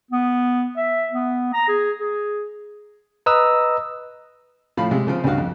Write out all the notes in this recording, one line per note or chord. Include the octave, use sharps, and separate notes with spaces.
B3
E5
B3
A#5
G#4
G#4
B4 D#5 A#5 D#6 E6
A2 F3 F5 B5
C3 G#3
C#3 F3 C4
C#2 G2 D4 F#4 F5
F2